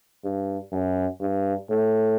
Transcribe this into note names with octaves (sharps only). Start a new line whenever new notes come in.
G2
F#2
G2
A2